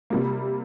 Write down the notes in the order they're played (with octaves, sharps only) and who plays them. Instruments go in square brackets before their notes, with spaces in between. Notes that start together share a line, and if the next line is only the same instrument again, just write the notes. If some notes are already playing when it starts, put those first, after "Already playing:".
[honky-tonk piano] C3 G3 A#3